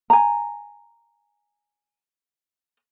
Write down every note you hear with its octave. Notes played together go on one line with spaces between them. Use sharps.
G#5 A#5